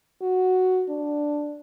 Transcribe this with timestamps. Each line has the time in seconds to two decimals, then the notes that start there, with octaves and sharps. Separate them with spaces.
0.21 F#4
0.89 D4